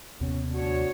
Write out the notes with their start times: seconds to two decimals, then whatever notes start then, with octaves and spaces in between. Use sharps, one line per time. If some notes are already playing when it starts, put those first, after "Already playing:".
0.21 D#2 C3 B3 C#4
0.54 D2 D4 F#4 C#5